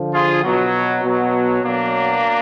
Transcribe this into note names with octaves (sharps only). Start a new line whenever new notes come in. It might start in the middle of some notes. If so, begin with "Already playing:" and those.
Already playing: D3 F3
F4 G#4
B2 F#3
B2 F#3
B2 F#3 A#3 D4